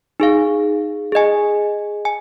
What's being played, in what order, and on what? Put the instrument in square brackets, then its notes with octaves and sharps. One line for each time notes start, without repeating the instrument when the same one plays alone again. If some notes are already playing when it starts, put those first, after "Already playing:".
[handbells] D#4 G#4 F5
G#4 D#5 G#5
G#5